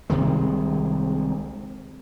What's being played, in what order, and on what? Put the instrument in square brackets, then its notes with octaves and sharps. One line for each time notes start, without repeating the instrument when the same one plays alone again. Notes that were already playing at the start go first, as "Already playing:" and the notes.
[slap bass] C2 C3 D#3 G#3